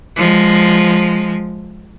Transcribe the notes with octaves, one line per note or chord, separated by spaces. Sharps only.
F3 G#3